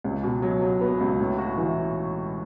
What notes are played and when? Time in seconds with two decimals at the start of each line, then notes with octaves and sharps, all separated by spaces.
0.04 C#2
0.23 B2
0.42 F#3
0.62 F#3
0.81 B3
1.01 C#2
1.20 A2
1.38 F#4
1.57 E3